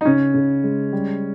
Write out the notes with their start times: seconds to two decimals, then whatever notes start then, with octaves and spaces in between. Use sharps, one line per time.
0.01 D#4
0.05 C#3 C#4
0.34 C#3
0.64 G#3
0.93 G3